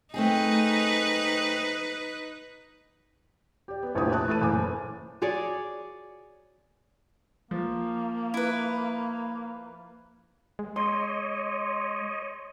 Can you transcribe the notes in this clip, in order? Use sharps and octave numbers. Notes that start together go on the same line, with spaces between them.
A3 C4 D#4 G#4 B4
G4 D5
B3
F1 A#1 A2 G4 B4 D#6
A5 D#6 F#6
E3 A3 B4 A6 D#7
F#1 A2 E3 G#5 D6
F#4 G#4 C#5 D5
F3 A#3
E4 B4
G#3
C#5 D#5 C6